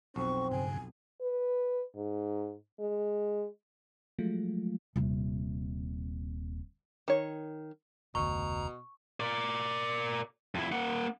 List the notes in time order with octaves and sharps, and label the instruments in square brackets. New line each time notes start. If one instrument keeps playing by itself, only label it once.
[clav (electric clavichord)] B1 F2 [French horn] C4 [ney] C#6
[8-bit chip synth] G2 C#3 [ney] G#5
[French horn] B4
G#2
G#3
[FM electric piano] F3 F#3 G#3 A3 F4
[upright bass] D#1 C3
[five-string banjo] D#3 C#5
[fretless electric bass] F1 D2 [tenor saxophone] B2 [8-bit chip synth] A#5 [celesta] C#6
[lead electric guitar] A#4 D5
F2 E4
A#3 F#5